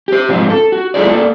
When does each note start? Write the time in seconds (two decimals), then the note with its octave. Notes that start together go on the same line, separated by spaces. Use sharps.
0.08 G4 C5
0.29 G#2 C3 F3 C4 F4
0.50 A4
0.72 F#4
0.94 E4 F4 G#4 A4 C5 D5
1.06 A#3 A4 D5